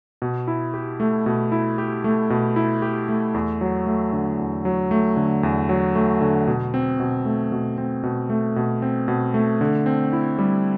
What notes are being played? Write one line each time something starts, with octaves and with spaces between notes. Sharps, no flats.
B2
E4
G4
A3
B2
E4
G4
A3
B2
E4
G4
A3
E2
F#3
A3
D3
E2
F#3
A3
D3
E2
F#3
A3
D3
B2
C4
B2
A3
B2
C4
B2
A3
B2
C4
B2
A3
D3
C4
E4
G3